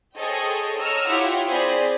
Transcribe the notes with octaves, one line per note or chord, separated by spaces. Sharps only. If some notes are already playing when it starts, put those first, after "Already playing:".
G#4 A4 C5 C#5 D#5 G5
C#5 D#5 A#5 E6 F6
E4 F4 G4 C#5 F#5 G5
C4 G#4 C5 D5 B5